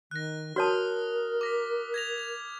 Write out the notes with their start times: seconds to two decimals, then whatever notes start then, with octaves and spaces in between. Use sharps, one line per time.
0.11 D#3 F#6 A#6
0.56 F#4 A#4 C#5 A5 D#6 F6
1.41 D6 A#6 B6
1.94 G#6 A#6 F7